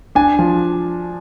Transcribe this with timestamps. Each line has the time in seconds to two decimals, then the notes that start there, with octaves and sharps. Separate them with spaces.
0.15 D4 G#5
0.39 F3